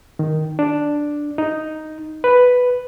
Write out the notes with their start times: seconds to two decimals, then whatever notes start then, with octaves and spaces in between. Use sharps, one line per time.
0.19 D#3
0.59 D4
1.38 D#4
2.24 B4